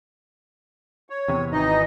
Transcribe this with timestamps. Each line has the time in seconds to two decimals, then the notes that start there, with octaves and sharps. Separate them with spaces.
1.10 C#5
1.28 E2 C3
1.53 G#1 E3 D#4 D#5